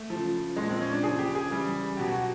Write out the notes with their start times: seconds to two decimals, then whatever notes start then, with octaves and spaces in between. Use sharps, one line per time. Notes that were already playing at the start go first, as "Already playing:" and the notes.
Already playing: A3
0.10 C#3 F3
0.56 A#2 F3 G#3
0.69 C4
0.81 C#4
0.91 D4
1.03 C#3 F3 G#4
1.19 G4
1.35 G#4
1.50 C#3 E3 G3
1.97 B2 F#3 G4
2.12 F#4